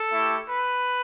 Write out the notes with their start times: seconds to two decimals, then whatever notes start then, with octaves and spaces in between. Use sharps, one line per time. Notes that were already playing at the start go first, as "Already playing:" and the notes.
Already playing: A4
0.13 A3 E4 G4
0.48 B4